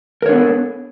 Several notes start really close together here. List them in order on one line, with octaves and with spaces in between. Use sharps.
A#4 C#5 D4 B3 A4